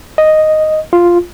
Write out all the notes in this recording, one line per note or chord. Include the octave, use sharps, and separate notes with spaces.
D#5
F4